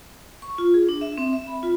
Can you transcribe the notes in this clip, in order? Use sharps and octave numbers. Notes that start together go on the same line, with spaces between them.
C#6
F4
G#4
D4
E5
C4
E5
B5
F4